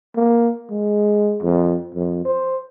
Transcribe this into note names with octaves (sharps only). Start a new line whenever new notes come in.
A#3
G#3
F2
F2
C5